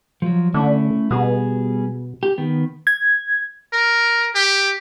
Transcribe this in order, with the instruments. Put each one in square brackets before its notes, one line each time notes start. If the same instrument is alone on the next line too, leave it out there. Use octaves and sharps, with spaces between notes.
[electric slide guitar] F3 F#3
[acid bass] D3 [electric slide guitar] A3 C#4 E4
[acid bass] B2 [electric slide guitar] G3 B3 G#4
[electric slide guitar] G4
D#3 B3
[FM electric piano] G#6
[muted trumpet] A#4
G4